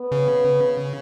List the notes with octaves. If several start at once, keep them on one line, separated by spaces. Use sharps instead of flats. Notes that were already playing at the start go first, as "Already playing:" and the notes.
Already playing: B3
C#3